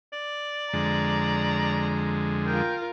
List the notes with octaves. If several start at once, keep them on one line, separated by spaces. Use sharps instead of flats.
D5
F2 D3 G#3 A#5
F4 A#4 G5